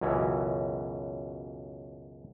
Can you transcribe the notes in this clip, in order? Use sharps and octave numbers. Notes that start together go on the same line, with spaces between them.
C#2 F#2 B2 E3 C#4